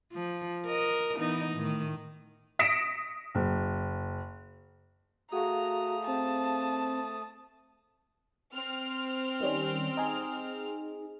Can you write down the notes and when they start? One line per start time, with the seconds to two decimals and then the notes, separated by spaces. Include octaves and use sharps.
0.13 F3
0.66 A#4 D#5
1.16 E3 B3 D#4
1.52 A2 D#3
2.59 D#6 A#6 B6 C#7 D7 E7
3.35 F#1
5.32 A3 F#4 G#4 F5 A#5 D#6
6.07 C4 A5
8.52 C4 F6
9.41 D#3 G3 C#4
9.97 D#4 G#4